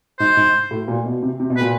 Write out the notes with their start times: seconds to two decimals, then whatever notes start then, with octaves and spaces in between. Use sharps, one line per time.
0.19 G#2 C5
0.37 G#2
0.71 A2
0.88 A#2
1.06 B2
1.23 C3
1.40 C3
1.50 B2
1.57 B4
1.61 A#2